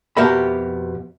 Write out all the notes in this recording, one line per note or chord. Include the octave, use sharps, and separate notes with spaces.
F2 B2 G4 A#4 E5 B5